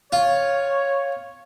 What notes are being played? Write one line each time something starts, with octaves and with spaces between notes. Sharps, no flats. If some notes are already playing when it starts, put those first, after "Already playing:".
F4 C#5